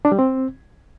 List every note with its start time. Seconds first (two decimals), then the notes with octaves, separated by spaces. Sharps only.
0.05 D4
0.12 G3
0.19 C4